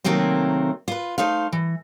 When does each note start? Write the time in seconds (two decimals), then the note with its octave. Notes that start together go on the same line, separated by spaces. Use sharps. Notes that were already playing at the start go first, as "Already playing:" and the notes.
0.04 C3 D#3 F#3 A3 A#3 C4
0.88 F4 B4
1.18 A3 D#4 C5 F5
1.53 E3